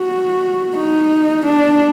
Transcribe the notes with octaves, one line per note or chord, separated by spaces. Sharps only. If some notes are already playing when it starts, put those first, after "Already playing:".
Already playing: F#4
D#4
D4